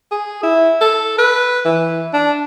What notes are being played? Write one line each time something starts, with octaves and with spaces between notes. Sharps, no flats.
G#4
E4
A4
B4
E3
D4